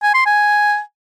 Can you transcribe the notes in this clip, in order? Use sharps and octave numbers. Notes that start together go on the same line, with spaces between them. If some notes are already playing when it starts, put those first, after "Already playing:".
G#5
C6
G#5